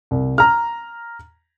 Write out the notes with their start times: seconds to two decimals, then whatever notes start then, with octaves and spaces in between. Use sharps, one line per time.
0.11 C2
0.38 A#5 F6